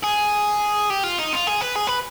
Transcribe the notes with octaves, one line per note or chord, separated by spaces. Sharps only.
G#4
G4
F4
D#4
F4
G#4
B4
G#4
B4